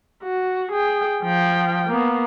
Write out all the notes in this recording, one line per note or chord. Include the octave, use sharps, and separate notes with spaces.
F#4
G#4 G5
F3 G5
A#3 B3